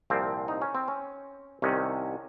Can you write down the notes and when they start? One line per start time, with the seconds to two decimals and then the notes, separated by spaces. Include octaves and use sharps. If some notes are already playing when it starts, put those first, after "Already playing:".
0.10 C2 A#2 F3 C4
0.48 D#4
0.62 C#4
0.75 C4
0.88 C#4
1.62 C2 C3 D#3 C#4